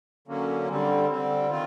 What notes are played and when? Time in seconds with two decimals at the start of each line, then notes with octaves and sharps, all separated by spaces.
0.28 D3 F#3 A#3 C#4
0.69 D3 G3 C4
1.10 D3 G3 C4
1.50 D#3 C4 F4